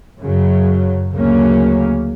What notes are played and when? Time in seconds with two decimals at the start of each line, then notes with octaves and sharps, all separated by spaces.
0.20 F#2 C#3 F#3
1.11 D2 C#3 F#3 A#3 C#4